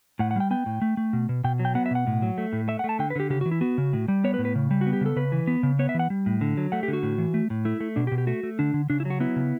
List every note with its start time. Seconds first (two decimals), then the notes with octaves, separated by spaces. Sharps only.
0.19 A2 F#5
0.31 F#5
0.36 G3 G5
0.51 B3 G5
0.66 A2
0.82 A3
0.97 A3
1.13 B2
1.29 B2
1.44 B2 G5
1.59 F#3
1.65 G5
1.75 B3 F#5
1.86 E5
1.91 B2 F#5
2.07 A2
2.22 F#3
2.38 A3
2.53 A2
2.68 A3 E5
2.79 F#5
2.84 A3 A5
2.99 D3 G5
3.10 B4
3.16 D3 G4
3.30 C#3 G4
3.41 F#4
3.46 E3
3.51 E4
3.61 B3 F#4
3.78 C#3
3.93 A2
4.08 G3
4.24 B3 C#5
4.34 B4
4.39 A2
4.45 B4
4.55 C#3
4.71 G3
4.81 F#4
4.86 B3
4.93 G4
5.01 C#3 A4
5.16 C#3 B4
5.32 E3
5.47 B3
5.63 C#3
5.79 B3 C#5
5.89 E5
5.95 E3 F#5
6.10 G3
6.26 A2
6.41 D3
6.57 F#3
6.72 A3 F#5
6.83 G4
6.88 D3
6.93 F#4
7.03 A2
7.18 E3
7.34 A3
7.50 A2
7.65 A3 E4
7.80 A3
7.96 B2 D4
8.07 G4
8.12 B2
8.18 G4
8.27 A3 F#4
8.43 A3
8.59 D3 D4
8.74 D3
8.90 C#3 D4
9.00 E4
9.05 F#3
9.10 F#4
9.20 B3 E4
9.36 C#3